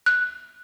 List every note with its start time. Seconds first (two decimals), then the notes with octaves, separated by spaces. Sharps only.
0.06 F#6